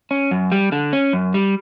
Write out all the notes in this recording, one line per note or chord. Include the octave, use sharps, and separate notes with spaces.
C#4
F#2
G3
D3
C#4
F#2
G3